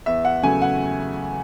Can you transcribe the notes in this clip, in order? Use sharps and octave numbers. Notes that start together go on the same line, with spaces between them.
E2 E5
F#5
C#3 F#3 A3 G#5
F#5